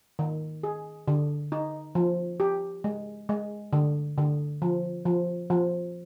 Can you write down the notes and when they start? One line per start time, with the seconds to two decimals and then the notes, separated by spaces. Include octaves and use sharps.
0.19 D#3
0.63 G#4
1.08 D3
1.52 D#4
1.95 F3
2.40 G4
2.84 G#3
3.29 G#3
3.73 D3
4.18 D3
4.62 F3
5.06 F3
5.50 F3